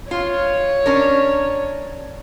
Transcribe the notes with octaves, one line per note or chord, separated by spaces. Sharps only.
F4 C#5
C#4 D4 A#4